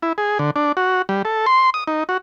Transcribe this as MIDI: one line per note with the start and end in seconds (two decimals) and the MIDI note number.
0.03 0.13 64
0.18 0.38 68
0.39 0.51 50
0.56 0.72 62
0.77 1.02 66
1.09 1.22 55
1.25 1.46 69
1.46 1.70 84
1.74 1.84 87
1.88 2.04 63
2.09 2.17 66